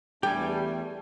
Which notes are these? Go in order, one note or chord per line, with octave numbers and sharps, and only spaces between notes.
E2 G3 A3 D4 G4 A4 G5 G#5